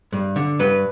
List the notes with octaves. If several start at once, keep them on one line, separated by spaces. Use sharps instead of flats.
G2
D3
G2 B4